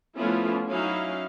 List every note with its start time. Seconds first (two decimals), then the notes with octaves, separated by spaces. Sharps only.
0.17 F3 A3 B3 C#4 E4 F4
0.68 F#3 C#4 D#4 E4 F5